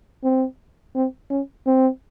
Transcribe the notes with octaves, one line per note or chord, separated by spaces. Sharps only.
C4
C4
C#4
C4